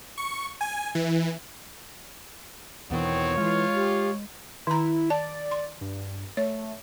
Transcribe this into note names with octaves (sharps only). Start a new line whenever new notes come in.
C#6
G#5
E3
E2 B2 D#3 E3 B3 C4 C#5
E3 G#3 F4
G4
D#3 E4 A#5
D5 A5
C6
G2
A3 C#5